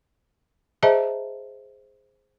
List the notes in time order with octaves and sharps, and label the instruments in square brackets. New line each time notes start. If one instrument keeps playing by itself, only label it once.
[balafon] G#4 C5 D#5 E5 A5 A#5